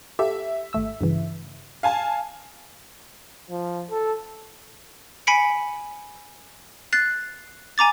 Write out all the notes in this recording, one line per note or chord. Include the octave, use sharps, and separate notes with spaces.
G4 A4 E5
G#1 A3 E6
G2 C#3 E3
F5 G#5 A5
F3
A4
G#5 B5 B6 C#7 D7
F#6 A6 C7
G#5 A#5 D6 A6